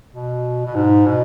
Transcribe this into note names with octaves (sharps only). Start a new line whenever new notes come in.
B2
B2
G#2
B2